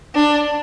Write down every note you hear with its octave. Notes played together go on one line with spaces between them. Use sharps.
D4